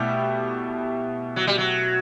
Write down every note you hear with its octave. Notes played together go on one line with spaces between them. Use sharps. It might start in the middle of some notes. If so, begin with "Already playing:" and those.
Already playing: B2 G3 A3 E4 G4
F#3
G3
F#3